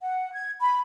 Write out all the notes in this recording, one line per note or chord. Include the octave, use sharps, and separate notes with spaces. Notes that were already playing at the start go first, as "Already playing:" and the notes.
F#5
G#6
B5